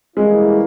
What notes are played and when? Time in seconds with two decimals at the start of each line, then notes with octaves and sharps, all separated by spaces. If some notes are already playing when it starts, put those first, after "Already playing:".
0.17 E3 G3 G#3 A#3 C#4 E4